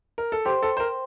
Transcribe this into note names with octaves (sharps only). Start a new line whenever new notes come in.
A#4
A4
G4 C5 G5 C6
A4
C5
A#4